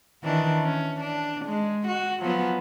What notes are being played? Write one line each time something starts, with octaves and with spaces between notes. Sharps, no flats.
D#3 E3 D4
C#4
D4
G#3
F#4
F3 F#3 B3